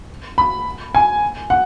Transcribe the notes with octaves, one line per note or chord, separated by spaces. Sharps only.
B5
G#5
F#5